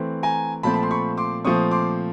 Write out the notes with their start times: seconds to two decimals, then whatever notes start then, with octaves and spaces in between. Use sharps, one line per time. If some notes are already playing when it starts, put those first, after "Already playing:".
Already playing: E3 A3 C4
0.23 G#5 A#5
0.63 A#2 F3 A3 C4 A5 B5
0.74 B5
0.83 C6
0.91 B5 C#6
1.17 C6 D6
1.45 A#2 F3 A3 C4 C#6 D#6
1.71 C6 D6